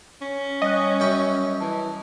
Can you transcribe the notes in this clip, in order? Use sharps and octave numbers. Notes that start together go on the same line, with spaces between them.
C#4
G3 D#5 F#6
F#2 G5
E3 A5